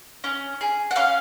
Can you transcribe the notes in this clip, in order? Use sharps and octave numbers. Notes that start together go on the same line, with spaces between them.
C#4
G#4
F#5
C#4 F5